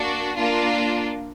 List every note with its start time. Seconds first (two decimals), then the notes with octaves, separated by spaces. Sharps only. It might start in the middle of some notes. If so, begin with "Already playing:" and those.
Already playing: A#3 D4 F#4
0.37 A#3 D4 F4